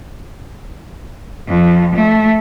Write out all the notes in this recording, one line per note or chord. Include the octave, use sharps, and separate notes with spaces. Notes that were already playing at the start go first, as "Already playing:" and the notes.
F2
A3